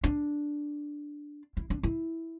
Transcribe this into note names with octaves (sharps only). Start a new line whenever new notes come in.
D4
E4
D4
E4